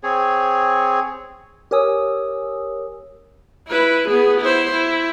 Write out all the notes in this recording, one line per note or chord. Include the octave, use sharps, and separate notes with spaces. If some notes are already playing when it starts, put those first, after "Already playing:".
C4 G#4 C#5
G4 A#4 C#5 G#5 D#6 E6
E4 B4
B3 G#4
E4 C5
E4